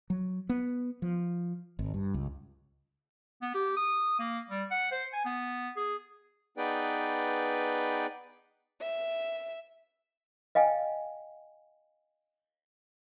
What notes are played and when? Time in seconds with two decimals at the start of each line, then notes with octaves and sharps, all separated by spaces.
0.10 F#3
0.49 B3
1.02 F3
1.79 G#1
1.94 G2
2.14 C#2
3.42 B3
3.55 G4
3.77 D#6
4.19 A#3
4.50 G3
4.71 F#5
4.92 C5
5.13 G#5
5.25 B3
5.77 G#4
6.57 B3 D#4 G#4 B4 D5 G5
8.81 E5
10.55 D#5 F5 G5 G#5